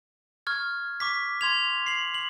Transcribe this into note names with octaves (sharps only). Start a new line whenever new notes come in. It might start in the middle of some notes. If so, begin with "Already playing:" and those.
C#6 F6 G#6
C#6 D6 B6
C6 G#6 F7
C7 F#7
F#7